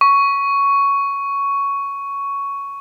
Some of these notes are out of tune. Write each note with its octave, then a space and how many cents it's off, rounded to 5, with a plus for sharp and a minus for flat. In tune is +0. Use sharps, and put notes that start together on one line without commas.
C#6 +10